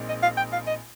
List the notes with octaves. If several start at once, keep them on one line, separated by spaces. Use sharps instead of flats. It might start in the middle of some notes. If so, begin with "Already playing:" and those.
Already playing: A#1 A#2 G#3 C4 D#4
D#5
F5
G5
F5
D#5